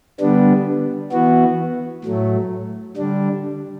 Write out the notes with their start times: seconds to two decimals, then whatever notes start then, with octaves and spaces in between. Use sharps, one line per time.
0.20 D3 G3 B3 D4
1.12 E3 B3 F#4
2.04 A2 F#3 A3
2.97 D3 G3 D4